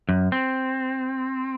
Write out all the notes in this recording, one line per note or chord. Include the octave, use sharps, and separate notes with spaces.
F#2
C4